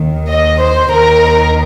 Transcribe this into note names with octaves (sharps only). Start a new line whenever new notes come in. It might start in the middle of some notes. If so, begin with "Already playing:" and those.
Already playing: D#2 D#3
D#5
C5
D#2 D#3 A#4